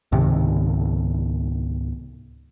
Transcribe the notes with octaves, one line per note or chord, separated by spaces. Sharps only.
C#2 G#2 C3 D#3